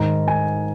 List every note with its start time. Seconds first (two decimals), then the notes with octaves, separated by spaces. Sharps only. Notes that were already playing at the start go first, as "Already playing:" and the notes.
Already playing: G#2 D#3 G#3 A#5
0.28 G#5